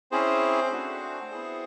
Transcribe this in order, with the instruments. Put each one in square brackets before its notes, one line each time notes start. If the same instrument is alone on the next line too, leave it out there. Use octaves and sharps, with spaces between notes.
[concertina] C4 C#4 E4 G#4 C5
A3 D4 F#4
B3 E4 G#4